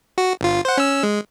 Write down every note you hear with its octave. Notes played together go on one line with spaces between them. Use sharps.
F#4
G1 F4
C5 F#5
C#4 E6
G#3